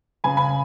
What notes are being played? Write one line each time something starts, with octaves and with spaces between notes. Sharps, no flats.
C#3 G#5 B5
G#5 B5